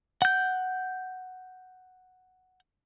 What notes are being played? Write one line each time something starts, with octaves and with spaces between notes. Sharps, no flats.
F#5 G6